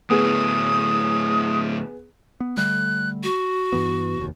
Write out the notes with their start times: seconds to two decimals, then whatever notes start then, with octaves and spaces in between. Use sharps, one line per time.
0.10 D2 A2 B3 G#4 D#6
2.40 B3
2.57 D3 G3 A3 F#6
3.23 F#4
3.72 G2 E3 B3
4.18 F1 D#2